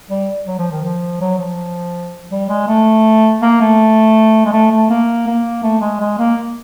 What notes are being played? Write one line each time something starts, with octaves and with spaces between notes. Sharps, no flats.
G3
F#3
F3
D#3
F3
F#3
F3
G3
G#3
A3
A#3
A3
G#3
A3
A3
A#3
A#3
A3
G#3
G#3
A#3